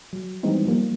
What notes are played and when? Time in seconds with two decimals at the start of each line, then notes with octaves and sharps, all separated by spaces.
0.13 F#3
0.43 E3 G3 G#3 B3 C4 D#4
0.66 F3 G3 A#3